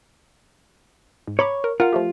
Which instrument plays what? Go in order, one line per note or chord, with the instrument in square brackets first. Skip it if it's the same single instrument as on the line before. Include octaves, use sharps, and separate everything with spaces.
[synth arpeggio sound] G#2
[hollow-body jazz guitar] C#5 [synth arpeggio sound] A#5 B5 D6
[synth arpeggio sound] A#4
[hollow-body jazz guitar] F4 [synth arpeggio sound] A#4 F#5
[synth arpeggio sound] F3 A3 G4